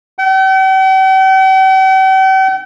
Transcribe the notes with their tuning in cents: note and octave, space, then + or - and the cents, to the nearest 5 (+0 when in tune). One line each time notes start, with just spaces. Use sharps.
G5 -45